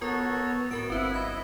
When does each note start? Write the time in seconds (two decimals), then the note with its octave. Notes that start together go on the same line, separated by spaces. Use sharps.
0.01 B3 F4 F#4 A4 A#4 C#5 C#6
0.71 A2 F#4 A#4 E6 D7
0.90 G1 C4 E4 B4 C5 F#5
1.14 D#5 B5 G#6